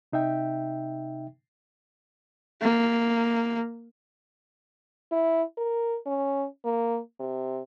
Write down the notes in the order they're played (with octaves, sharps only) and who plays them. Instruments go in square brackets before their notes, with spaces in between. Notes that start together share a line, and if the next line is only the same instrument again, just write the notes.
[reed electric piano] C3 D#4 E5 G5
[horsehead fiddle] A#3
[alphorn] E4
A#4
C#4
A#3
C3